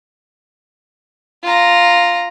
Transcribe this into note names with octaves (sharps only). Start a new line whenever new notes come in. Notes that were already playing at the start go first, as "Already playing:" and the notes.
F4 A#5